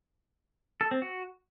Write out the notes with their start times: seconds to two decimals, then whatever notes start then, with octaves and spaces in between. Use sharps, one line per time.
0.81 A4
0.91 C4
1.02 F#4